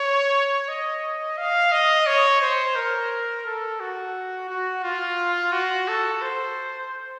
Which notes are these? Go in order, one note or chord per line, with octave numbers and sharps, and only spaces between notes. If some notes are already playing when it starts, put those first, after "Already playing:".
Already playing: C#5
D#5
F5
D#5
C#5
C5
A#4
A4
F#4
F#4
F4
F#4
A4
C5